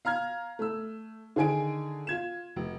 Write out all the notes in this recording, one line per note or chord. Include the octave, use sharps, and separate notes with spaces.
F5 A#5 F6 G#6
A3 E6
D3 D#3 G#4 G#5 D7
F4 G#6 E7
F1